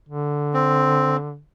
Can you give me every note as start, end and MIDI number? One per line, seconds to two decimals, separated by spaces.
0.09 1.39 50
0.54 1.17 60